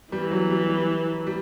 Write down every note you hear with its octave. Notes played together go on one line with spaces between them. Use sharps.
E3 G3
F#3
G3
G3
G3